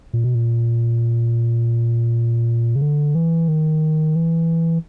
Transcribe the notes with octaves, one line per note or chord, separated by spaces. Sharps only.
A#2
B2
A#2
C#3
D3
E3
D#3
E3